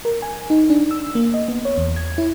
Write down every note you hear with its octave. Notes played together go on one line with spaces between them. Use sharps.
A#4
G#5
D#4
D4
E6
A#3
D#5
B3
C#5
E2
G#6
E4